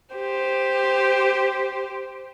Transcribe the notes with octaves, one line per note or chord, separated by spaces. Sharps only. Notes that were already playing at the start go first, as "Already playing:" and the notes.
G4 C5